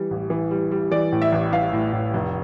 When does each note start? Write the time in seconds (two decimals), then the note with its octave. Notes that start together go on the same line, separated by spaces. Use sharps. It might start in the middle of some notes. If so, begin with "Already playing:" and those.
Already playing: E3 G3
0.11 A1
0.30 E3
0.51 G3
0.71 G3
0.91 E3 D5
1.12 A2
1.22 E5
1.32 A1
1.52 A1 F5
1.73 A2
1.93 A2
2.14 F1